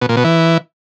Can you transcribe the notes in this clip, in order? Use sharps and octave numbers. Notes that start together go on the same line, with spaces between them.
B2
A#2
B2
E3